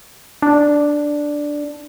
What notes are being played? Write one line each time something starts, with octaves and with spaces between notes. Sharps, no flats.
D4